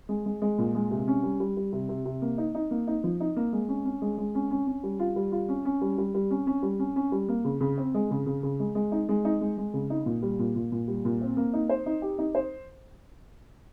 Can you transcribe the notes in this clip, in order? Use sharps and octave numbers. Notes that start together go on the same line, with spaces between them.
G#3
G#3
G#3
A#2
G#3
C3
C#4
G3
G3
G3
C3
C3
C3
A#3
D#4
D#4
A#3
D#4
F3
D#4
A#3
G#3
C#4
C#4
G#3
G#3
C#4
C#4
C#4
G3
F4
G3
F4
C#4
C#4
G3
G3
G3
C#4
C#4
G3
C#4
C#4
G3
A#3
C#3
C#3
C4
G#3
C#3
C#3
C#3
G#3
G#3
D#4
G#3
D#4
G#3
G#3
C#3
D#4
A#2
G3
A#2
A#2
A#2
G3
A#2
C4
A#3
D#4
C5
D#4
G4
D#4
C5